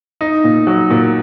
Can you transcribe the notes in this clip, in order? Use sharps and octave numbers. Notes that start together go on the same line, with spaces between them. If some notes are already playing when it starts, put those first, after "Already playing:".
D#4
A#2
F#3
A#2